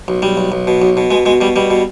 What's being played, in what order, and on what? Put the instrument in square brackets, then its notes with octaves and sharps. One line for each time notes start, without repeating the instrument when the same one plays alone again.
[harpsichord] B1
B1 G3
B1
B1
B2
B1
B2
B2 G#3
B2 G#3
B2 G3
B2 G3
B2